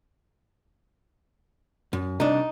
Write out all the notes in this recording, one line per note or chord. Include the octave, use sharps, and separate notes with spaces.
F#2
C2 D4 D#4